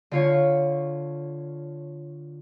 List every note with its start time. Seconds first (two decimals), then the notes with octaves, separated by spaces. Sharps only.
0.11 D3 F4 C#5